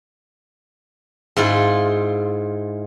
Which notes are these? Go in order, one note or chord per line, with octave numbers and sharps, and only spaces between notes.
G#2 E4 F4